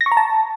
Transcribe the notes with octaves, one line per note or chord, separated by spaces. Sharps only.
A#6
C#6
A#5
A5